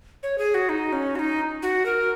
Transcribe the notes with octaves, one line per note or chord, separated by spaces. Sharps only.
C#5
G#4
F#4
D#4
C#4
F#4
D#4
F#4
A#4